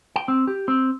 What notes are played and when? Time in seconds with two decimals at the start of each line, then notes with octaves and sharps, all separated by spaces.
0.16 G5
0.28 C4
0.47 G4
0.68 C4